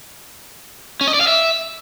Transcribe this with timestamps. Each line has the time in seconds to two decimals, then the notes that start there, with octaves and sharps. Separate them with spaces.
1.01 C#4
1.07 D#5
1.14 D5
1.21 F5
1.27 E5